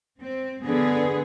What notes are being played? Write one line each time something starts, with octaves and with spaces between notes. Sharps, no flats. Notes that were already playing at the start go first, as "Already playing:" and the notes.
C4
D3 B3 G#4 B4